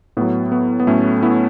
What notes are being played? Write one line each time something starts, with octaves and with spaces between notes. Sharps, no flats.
A2 F#3 B3
B3
B3
A2 F#3 A3 C#4
B3 E4